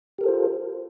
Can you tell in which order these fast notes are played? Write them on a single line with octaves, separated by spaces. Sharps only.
G4 A#4 A4 C5 F4